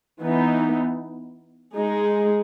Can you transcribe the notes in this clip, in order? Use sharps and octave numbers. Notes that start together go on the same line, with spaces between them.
E3 B3 D#4
G#3 D#4 G#4